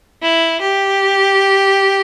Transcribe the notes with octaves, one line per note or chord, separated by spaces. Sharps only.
E4
G4